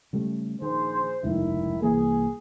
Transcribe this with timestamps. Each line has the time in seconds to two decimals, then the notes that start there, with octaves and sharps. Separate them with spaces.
0.13 C#3 G3 A3
0.62 A#1 D#3 G#4 C5
1.23 F1 C#2 G2 D#3 E4
1.82 C2 E3 A#3 G#4